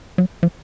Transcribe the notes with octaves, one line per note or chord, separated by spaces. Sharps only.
F#3
F3